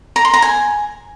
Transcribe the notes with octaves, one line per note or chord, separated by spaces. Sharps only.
A#5
C6
A#5
G#5